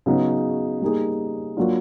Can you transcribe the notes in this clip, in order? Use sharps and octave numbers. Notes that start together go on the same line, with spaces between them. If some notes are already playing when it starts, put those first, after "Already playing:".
C#3 F#3 B3 D#4 G#4
G3 A#3 D#4 G#4
F#3 A#3 D4 F4